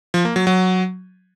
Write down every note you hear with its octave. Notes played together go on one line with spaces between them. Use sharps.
F3
A#3
F#3
F#3